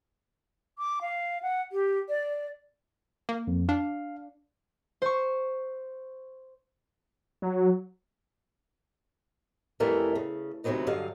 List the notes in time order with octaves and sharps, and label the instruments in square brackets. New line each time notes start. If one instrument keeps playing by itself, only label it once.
[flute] D6
F5
F#5
G4
D5
[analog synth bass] A#3
[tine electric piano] F2
[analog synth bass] D4 [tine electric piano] F5
[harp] C5 C#6
[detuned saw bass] F#3
[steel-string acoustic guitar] F2 E3 G3 A3 A#4
C#3
D2 C3 F3 F#3 B3 D#4
G2 D3 F#3 D#5 F5